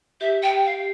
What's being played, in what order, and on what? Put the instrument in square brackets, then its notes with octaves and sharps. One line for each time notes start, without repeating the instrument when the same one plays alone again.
[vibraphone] G4 [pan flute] E5
[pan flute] G5
F5